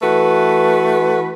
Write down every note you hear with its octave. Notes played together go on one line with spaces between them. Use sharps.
E3 A3 F#4 B4